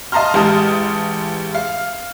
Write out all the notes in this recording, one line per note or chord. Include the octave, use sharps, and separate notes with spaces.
D#5 F5 A5 A#5 C6 F6
A1 G#3 G4 A5 D#6
F5